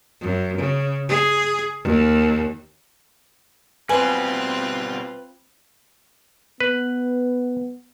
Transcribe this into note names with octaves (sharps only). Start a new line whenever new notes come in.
F#2
C#3
G#4
D#2
B2 G3 C4 F4 B4 G#5
B3 B4